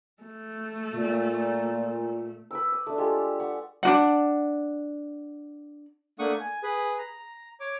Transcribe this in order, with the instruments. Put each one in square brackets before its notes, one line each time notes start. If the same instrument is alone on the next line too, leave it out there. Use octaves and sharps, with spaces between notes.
[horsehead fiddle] A3
[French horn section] A#2
[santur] B4 D6 E6
D#6
A3 D4
G#3 F4 G4 A4
F#5 C#6
[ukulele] D4 F#4 F#5
[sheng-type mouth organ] A3 A#3 D4 F#5 C#6 D#6
G#5
G#4 B4
A#5
C#5 D6